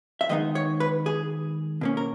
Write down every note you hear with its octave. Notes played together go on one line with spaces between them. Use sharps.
E5
D#3 G#3 B3 D#4 D#5
C#5
B4
G#4
B2 A#3 C#4
A#4